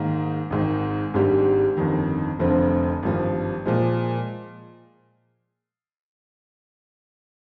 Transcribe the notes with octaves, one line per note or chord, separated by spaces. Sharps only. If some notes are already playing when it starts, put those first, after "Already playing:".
Already playing: G#2 D#3 A#3
G#1 G#2 D#3
G#1 G#2 G3 D4 G4
G1 F2 D#3
F1 F2 D3 F3 C4
G#1 G2 F3
A#2 F3 G#3